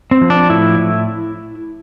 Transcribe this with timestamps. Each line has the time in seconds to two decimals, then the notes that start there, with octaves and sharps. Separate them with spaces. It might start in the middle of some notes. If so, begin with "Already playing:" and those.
0.11 C4
0.21 F3
0.30 D4
0.50 A2 E4
0.79 A2